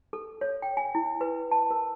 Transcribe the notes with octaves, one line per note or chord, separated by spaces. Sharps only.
A4
C#5
G5
G#5
E4
B4
A5
A#4